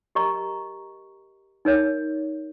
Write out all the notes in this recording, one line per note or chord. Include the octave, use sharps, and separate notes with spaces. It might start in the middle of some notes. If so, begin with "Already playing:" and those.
G4 A#4 D#5 A#5 C#6
D#4 A#4 C#5